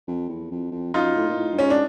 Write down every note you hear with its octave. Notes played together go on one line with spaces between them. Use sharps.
F2
E2
F2
F2
F#2 D#4 F4
A2
A#2
A2
G2
G#2 C#4
D4